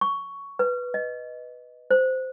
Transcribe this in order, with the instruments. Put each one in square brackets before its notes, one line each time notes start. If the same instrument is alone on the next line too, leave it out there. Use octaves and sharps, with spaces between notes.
[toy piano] C#6
B4
D#5
C5